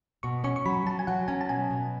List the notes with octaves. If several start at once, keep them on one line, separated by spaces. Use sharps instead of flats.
B2 C#6
C#4 C#6
C#6
F#3 B5
F#3 A5
G#5
F#3 F#5
C#4 G#5
A5
B2 G#5
B2